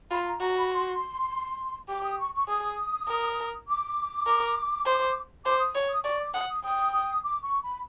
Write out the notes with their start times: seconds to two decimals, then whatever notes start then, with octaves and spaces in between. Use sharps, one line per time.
0.11 F4 B5
0.26 A#5
0.40 F#4 A#5
0.56 B5
0.70 C6
1.88 G4 D6
2.03 D#6
2.19 C#6
2.34 C#6
2.48 G#4 D#6
3.08 A#4
3.67 D6
4.26 A#4
4.85 C5
5.45 C5 D6
5.59 D#6
5.75 C#5
5.89 D#6
6.04 D5 C#6
6.19 D6
6.34 F#5 D#6
6.48 D#6
6.64 G5 D#6
6.93 D#6
7.23 D6
7.42 C#6
7.63 B5